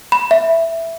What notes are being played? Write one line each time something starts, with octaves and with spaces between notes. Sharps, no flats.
B5
E5